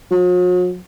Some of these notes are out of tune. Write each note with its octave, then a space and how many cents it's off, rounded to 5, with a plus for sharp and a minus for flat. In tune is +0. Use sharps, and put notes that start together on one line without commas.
F#3 -45